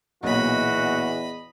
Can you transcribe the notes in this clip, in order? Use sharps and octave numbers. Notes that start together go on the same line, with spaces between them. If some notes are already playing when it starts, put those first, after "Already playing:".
B1 E2 A#2 F#4 D#5 B5